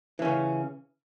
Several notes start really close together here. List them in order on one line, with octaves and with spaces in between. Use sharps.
E3 C#4 C#3